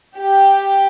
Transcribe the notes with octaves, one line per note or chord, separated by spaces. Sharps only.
G4